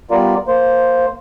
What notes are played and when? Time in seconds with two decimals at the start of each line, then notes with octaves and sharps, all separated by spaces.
0.11 G3 B3 F4 A#4 D5
0.48 A#3 C5